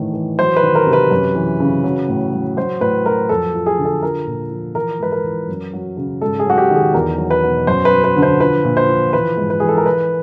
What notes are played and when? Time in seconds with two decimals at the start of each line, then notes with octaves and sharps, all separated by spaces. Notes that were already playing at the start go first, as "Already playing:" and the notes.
Already playing: A2 D#3 E3
0.13 E3
0.39 F#3 C5
0.56 B4
0.63 D#3
0.75 A#4
0.87 C3
0.93 B4
1.11 F#2
1.35 E3
1.60 C#3
1.84 F#3
2.09 A2
2.33 F#3
2.57 F#3 C5
2.81 A2 B4
3.05 F#3 A#4
3.29 F2 A4
3.54 F3
3.66 G#4
3.79 D3
3.85 A4
4.02 F3 A#4
4.27 A#2
4.51 F3
4.75 E3 A#4
4.99 G#2 B4
5.12 A#4
5.24 E3
5.49 F#2
5.73 F#3
5.97 C#3
6.21 G#2 A4
6.39 G#4
6.46 F#3 F#4
6.58 G4
6.70 D#3
6.76 G#4
6.94 E2 A#4
7.18 F#3
7.31 B4
7.43 B2
7.67 F#2 C5
7.85 B4
7.91 F#3
8.04 B4
8.16 D3
8.22 C5
8.40 F3 B4
8.64 A#2
8.77 C5
8.89 F3
9.13 E3 B4
9.37 G#2
9.50 B4
9.60 E3 G#4
9.68 A4
9.77 A#4
9.86 E3 B4